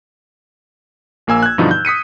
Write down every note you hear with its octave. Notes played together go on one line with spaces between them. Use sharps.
A#1 A#3 G#5 E6
F#6 G#6
G2 B2 D3 E3 F3 D#4
G6
D#6 B6 C#7 D#7